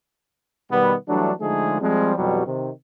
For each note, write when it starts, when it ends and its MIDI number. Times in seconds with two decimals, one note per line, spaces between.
0.70 0.94 47
0.70 0.94 51
0.70 0.94 55
0.70 0.94 59
1.08 1.32 52
1.08 1.32 54
1.08 1.32 55
1.08 1.32 57
1.08 1.32 62
1.41 1.81 50
1.41 1.81 53
1.41 1.81 56
1.41 1.81 57
1.41 1.81 63
1.41 1.81 68
1.81 2.13 53
1.81 2.13 55
1.81 2.13 56
1.81 2.13 60
2.16 2.45 41
2.16 2.45 47
2.16 2.45 52
2.16 2.45 54
2.16 2.45 55
2.46 2.70 48
2.46 2.70 51